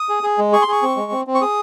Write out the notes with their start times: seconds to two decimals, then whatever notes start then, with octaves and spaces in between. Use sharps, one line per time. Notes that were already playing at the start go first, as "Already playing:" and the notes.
Already playing: D#6
0.09 G#4
0.23 G#4
0.38 G#3
0.52 G#4 C#6
0.62 C6
0.68 G#4 C#6
0.82 C4
0.97 G#3
1.12 C4
1.27 C4
1.35 C#6
1.41 G#4 D#6